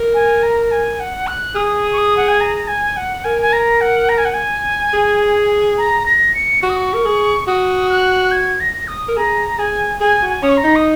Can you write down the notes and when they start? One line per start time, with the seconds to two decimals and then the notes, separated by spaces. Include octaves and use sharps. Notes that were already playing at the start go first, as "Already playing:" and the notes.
Already playing: A#4
0.14 G#5
0.43 A#5
0.71 G#5
1.00 F#5
1.27 F#6
1.55 G#4 D#6
1.93 C#6
1.98 D#6
2.17 F#5
2.28 G#5
2.41 A#5
2.68 G#5
2.97 F#5
3.24 A#4 G#5
3.42 G#5
3.53 A#5
3.81 F#5
4.09 A#5
4.18 G#5
4.25 F#5
4.34 G#5
4.93 G#4
5.78 A#5
6.06 A#6
6.35 C#7
6.63 F#4 C#6
6.70 D#6
6.76 C#6
6.94 A#4
7.05 G#4
7.47 F#4 D#6
7.90 F#6
8.32 G#6
8.60 A#6
8.88 D#6
9.08 A#4
9.17 G#4 A#5
9.58 G#4 G#5
10.00 G#4 G#5
10.22 F#4
10.29 G#5
10.42 C#4 D#6
10.49 C#6
10.57 A#5
10.64 D#4
10.76 D#6